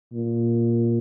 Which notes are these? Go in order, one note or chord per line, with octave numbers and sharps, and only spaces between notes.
A#2